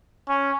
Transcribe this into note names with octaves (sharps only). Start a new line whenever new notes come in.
C#4